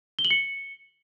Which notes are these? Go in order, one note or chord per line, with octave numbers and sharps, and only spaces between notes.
G7
F#7
C#7